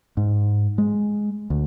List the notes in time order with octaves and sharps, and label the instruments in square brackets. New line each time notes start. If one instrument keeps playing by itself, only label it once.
[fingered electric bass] G#2
G#3
D2